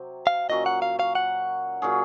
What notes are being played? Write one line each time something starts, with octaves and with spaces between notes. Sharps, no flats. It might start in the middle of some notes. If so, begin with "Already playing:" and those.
Already playing: C3 F#3 C4
F5
A#2 F#3 C#4 D#5
F#5
F5
F5
F#5
A#2 F#3 C#4 G#4